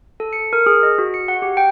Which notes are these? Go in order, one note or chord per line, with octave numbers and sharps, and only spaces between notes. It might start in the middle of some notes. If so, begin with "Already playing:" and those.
A4
C#7
A#4
G#4
D#5
F#4
C#7
F#5
G4
G5